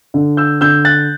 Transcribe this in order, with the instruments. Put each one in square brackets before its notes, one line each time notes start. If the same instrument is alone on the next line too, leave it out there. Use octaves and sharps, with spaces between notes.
[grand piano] D3
E6 G6
D3 E6 G6
F#6 A6